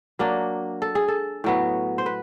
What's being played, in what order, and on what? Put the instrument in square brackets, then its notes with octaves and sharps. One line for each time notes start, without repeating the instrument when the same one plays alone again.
[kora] F#3 A#3 D4
A4
G#4
A4
A2 F#3 B3
C5
B4